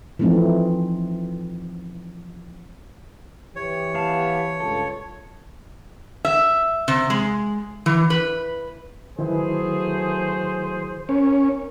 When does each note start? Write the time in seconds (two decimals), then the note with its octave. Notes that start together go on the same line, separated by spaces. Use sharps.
0.19 E3 F3 A3 C4 D#4
3.56 E3 G4 C#5
3.94 B3 F5 A5
4.60 C#2 G2 F4 A4
6.25 E5
6.88 C3
7.10 G#3
7.86 E3
8.10 B4
9.19 D#3 F#3 A3 E4 G#4 B4 C5
11.09 C#4 A#4